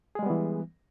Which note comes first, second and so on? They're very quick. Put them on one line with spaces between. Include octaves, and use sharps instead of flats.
G#4 G#3 G3 B3 E3